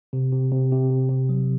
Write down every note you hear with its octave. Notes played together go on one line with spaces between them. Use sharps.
C3
C3
C3
C3
C3
C3
F#3